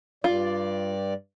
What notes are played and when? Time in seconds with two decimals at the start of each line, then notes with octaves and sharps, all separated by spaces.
0.24 G2 G3 F4 D5